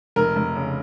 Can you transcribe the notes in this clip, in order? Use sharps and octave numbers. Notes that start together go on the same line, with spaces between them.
F1 A#4
F1
C#3